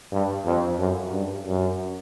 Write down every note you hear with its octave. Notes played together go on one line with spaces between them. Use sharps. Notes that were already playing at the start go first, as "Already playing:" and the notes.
G2
F2
F#2
G2
F#2